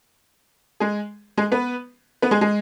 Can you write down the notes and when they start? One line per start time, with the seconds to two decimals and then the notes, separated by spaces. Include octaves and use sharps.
0.80 G#3 G#4
1.38 G#3 G#4
1.52 B3 B4
2.22 B3 B4
2.31 G#3 G#4
2.41 G#3 G#4